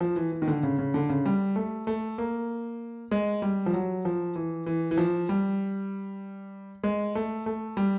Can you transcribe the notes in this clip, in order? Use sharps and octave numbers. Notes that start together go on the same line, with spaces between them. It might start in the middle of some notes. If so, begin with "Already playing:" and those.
F3
E3
E3
D#3
D3
C#3
C#3
D3
C#3
G3
A3
A3
A#3
G#3
G3
F3
F#3
F3
E3
E3
E3
F3
G3
G#3
A3
A3
G3